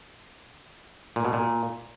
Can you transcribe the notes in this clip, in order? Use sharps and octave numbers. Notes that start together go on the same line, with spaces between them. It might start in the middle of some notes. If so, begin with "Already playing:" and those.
A#2
B2
A#2